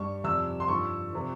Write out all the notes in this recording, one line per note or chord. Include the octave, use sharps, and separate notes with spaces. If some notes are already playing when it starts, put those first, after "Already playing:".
Already playing: G2 G3 C#6
F2 C3 G3 E6
C6
G2 F3 C#6
C3 F3